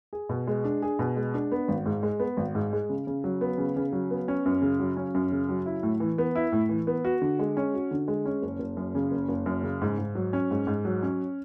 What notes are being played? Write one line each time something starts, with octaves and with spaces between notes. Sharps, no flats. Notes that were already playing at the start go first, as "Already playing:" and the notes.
G#4
B2
G#3
D4
G#4
B2
G#3
D4
B3
G#1
G#2
G#3
B3
G#1
G#2
G#3
C#3
C#3
F#3
B3
C#3
C#3
F#3
B3
C#4
F#2
C#3
F#3
C#4
F#2
C#3
F#3
E4
A2
E3
B3
E4
A2
E3
B3
F#4
D3
G#3
C#4
F#4
D3
G#3
C#4
F#1
F#1
F#2
C#3
F#1
F#1
F#2
C#3
G#2
G#2
F#3
C#4
G#2
G#2
F#3
C#4